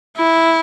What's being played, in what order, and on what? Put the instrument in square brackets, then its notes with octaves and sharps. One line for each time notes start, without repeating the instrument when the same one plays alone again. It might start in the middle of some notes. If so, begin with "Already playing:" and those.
[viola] E4